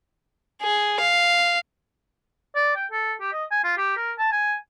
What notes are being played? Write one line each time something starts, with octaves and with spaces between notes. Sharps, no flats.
G#4
F5
D5
G5
A4
G4
D#5
G#5
F4
G4
A#4
A5
G#5